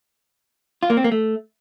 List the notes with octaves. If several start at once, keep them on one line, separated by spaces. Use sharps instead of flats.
F4
A#3
C4
A#3
A3